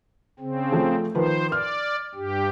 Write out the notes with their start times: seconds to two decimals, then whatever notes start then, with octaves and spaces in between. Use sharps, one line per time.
0.39 C#3 C4
0.72 F3 A3
1.15 D#3 F3 B4 C5
1.52 D5 F6
2.15 G2 G4